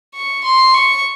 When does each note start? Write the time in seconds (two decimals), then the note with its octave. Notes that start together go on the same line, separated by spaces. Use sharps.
0.14 C#6
0.44 C6
0.74 C#6